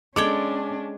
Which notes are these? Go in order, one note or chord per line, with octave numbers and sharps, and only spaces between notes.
G#3 C#4 D4 A4 G5 D6 G#6